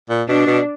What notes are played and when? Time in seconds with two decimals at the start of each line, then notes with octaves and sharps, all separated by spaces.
0.10 A#2
0.29 B2 D4
0.47 B2